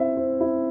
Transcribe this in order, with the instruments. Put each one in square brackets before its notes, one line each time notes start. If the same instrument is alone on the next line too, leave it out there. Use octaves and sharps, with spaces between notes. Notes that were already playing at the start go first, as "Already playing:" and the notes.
Already playing: [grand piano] C4 E4 C5 E5
C4
E4